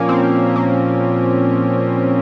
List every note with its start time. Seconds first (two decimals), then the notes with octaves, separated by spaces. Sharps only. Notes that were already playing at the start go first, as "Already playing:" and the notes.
Already playing: A#2 F3 A#3 C#4
0.09 C4
0.56 A#3